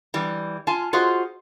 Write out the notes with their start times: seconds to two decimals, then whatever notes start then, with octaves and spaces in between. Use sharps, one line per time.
0.14 E3 G3
0.67 F4 G#5 A5
0.93 F4 F#4 G#4 C5 D#5